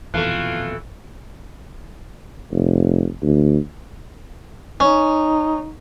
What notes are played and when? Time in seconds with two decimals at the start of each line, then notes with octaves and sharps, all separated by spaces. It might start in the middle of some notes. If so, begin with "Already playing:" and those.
0.14 D#1 F2 B2 E3 A3 F4 A4 F#6
2.52 F1
3.22 D2
4.80 C#4 D#4